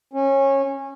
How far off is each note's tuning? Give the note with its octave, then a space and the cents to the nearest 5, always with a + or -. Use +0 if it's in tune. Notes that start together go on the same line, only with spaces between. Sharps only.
C#4 -20